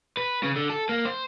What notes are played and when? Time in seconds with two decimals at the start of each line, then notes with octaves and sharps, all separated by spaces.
0.17 B4
0.43 C#3
0.56 D3
0.70 A4
0.89 A#3
1.05 C5